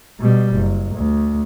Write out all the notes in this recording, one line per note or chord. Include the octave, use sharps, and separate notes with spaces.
B2 G3
F#1
D2